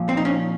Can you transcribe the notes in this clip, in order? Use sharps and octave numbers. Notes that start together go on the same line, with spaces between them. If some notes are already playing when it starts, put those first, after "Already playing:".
Already playing: A#2 F3
C4
D#4
C#4